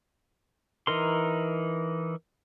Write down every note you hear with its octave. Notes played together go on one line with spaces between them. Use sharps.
E3 D#4 A#4 C6